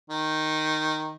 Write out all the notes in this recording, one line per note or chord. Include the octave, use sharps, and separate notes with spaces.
D#3